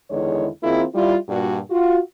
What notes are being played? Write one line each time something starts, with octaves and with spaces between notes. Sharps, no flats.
E2 D3 D#3 G#3 E4 C#5
D#3 A#3 C4 E4 F4 G#4
G3 E4 F4
G2 A#2 F#4
F4 F#4